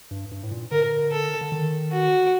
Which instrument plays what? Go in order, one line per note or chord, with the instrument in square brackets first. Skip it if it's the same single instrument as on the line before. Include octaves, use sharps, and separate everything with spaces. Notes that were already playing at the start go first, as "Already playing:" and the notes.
[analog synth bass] G2
G2
A2
A#2
[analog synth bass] D3 [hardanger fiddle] A#4
[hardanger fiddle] A4
[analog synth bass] D3
D#3
[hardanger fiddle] F#4